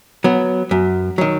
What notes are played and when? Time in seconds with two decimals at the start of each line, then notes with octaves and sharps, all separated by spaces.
0.24 F#3 B3
0.71 F#2
1.18 D#3 F#3